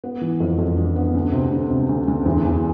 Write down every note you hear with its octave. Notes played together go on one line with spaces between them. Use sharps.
B3
E3
F2
F2
D4
B3
D2
C3
D2
C3
D2
D2
E2
E2